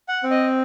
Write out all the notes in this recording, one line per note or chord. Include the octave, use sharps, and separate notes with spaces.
F#5
C4
D#5